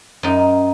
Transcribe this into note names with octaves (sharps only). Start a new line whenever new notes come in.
F#2 D#4